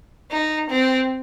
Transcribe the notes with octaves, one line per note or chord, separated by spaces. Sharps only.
D#4
C4